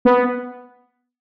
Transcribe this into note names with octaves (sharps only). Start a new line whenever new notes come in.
B3